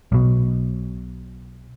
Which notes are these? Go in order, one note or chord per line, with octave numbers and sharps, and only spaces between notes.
B1 B2